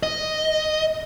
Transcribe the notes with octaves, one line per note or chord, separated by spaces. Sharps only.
D#5